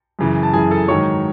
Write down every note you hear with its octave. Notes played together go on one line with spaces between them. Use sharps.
F#2 C#3 E3
A5
F#2 C#3 E3 G#4 G#5
A4 A5
G#2 D#3 F#3 C#5 C#6